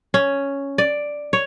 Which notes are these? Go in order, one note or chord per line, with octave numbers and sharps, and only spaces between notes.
C#4
D5
C#5